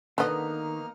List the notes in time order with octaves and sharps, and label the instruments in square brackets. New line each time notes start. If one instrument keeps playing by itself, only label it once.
[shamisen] D3 D#5 [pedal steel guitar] D#3 [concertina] A#3 D#4 F6 [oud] B3